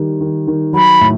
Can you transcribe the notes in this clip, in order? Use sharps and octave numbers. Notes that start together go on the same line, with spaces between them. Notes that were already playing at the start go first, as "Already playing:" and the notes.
Already playing: D#3 G3
D#3
D#3
F#3 B5
A2